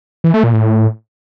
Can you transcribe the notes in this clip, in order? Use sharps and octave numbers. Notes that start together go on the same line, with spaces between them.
E3
A3
A#2
A2